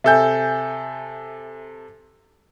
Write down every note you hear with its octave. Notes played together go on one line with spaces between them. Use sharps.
C3 A4 E5 G#5 G6